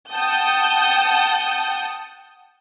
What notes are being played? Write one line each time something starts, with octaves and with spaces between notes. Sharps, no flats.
F#5 G5 A5 D#6 G6